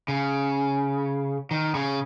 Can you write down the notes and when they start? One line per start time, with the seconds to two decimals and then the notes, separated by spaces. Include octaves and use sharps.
0.08 C#3
1.51 D#3
1.75 C#3